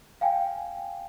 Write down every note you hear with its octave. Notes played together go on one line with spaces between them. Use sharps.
F5 G5 G#5